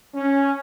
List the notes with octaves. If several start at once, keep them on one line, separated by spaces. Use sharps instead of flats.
C#4